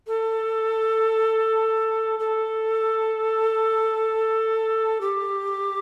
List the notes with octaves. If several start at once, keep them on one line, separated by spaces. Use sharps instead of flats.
A4
A4
G4